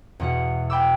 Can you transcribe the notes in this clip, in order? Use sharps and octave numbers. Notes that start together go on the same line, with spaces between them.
E2 B2 F#5
G5 B5 D6 E6